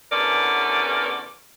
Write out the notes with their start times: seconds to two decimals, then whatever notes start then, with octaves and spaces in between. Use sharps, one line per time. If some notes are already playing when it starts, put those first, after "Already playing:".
0.12 E2 D3 B3 C#4 A#4 D5